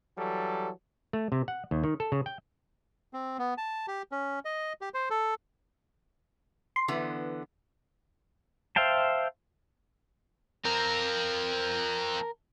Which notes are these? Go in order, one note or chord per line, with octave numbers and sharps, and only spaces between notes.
E3 F#3 G3 A4
A3
C3
F#5
D#2
D#3
A4
C#3
G5
C4
B3
A5
G4
C#4
D#5
G4
C5
A4
C6
D3 E3 B3
C5 E5 F5 G5 A5
F3 C4 A#4